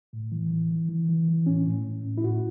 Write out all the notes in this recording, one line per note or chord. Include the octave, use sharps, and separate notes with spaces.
A2
E3
E3
E3
E3
E3
E3
A2 C#4
A2
A2
A2
E4
A2 F#4